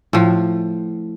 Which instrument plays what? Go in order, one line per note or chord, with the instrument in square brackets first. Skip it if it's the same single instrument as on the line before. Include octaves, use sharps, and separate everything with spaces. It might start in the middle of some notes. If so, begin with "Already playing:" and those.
[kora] A2 F3